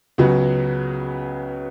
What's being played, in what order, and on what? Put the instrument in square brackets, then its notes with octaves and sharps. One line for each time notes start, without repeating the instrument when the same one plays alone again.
[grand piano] C#2 C#3 F#3 B3 F#4